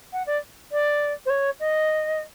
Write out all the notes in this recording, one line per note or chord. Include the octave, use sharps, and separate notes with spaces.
F#5
D5
D5
C5
C#5
D#5